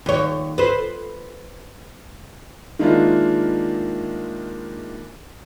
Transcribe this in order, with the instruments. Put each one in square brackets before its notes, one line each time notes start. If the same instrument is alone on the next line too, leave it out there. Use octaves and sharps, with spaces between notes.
[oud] D#2 C#5
B4 C5
[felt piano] D#3 G#3 A#3 D4 E4 F4